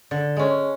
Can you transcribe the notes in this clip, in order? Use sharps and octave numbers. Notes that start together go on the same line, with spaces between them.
D3
G#3 C#4